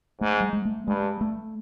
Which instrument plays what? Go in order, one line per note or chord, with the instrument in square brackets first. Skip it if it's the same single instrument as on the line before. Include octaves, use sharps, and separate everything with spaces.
[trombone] G#2 [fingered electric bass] A3
[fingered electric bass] G3
G#3
A3
[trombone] G2 [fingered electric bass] G#3
[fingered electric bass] A3